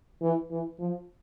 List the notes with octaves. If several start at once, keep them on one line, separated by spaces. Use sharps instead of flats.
E3
E3
F3